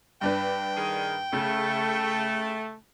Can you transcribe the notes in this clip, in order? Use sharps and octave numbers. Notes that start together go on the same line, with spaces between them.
G2 D4 B4 G5
D#3 G#4
C#3 A3